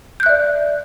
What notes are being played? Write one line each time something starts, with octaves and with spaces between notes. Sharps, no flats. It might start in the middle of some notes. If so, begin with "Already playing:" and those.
D5 E5 F#6 G6